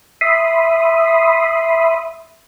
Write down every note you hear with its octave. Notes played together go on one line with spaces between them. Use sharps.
E5 B5 C6 D#6